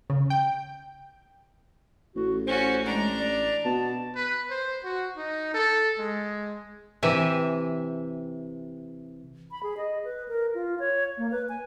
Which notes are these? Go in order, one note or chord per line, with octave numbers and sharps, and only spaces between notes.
C#3
G5
A1 F#4
C#4 F#4 C5
G#3 D4 A#5
D5
B2 A5
B4
C5
F#4
D#4
A4
G#3
C3 E3 G4 E5 G#5
B5
G#4
D#5
B4
A#4
F4
C#5
A#3
B4
G#5